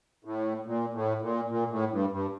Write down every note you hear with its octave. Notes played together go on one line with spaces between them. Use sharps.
A2
A#2
A2
A#2
A#2
A2
G2
G2